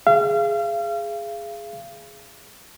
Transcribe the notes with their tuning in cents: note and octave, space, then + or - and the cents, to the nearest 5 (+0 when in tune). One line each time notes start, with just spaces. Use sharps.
G#4 +0 F5 -35